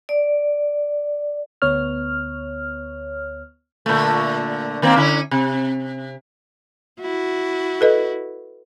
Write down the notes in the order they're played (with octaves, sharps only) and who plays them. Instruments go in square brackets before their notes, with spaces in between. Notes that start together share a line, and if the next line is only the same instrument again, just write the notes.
[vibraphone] D5
[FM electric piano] D2 B3 C#5 F6
[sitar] A#2 D3 A3
D#3 A#3 C4
D3 C#4 E4
C3
[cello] E4 F#4
[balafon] A4 B4 D#5